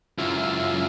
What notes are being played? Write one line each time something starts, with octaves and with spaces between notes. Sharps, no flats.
C#2 F#2 E4 F4